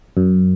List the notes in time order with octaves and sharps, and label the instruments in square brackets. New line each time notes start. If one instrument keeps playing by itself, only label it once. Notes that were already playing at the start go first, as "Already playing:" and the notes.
[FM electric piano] F#2